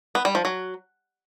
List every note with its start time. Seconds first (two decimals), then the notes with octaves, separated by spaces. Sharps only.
0.15 B3
0.25 G3
0.35 F3
0.45 F#3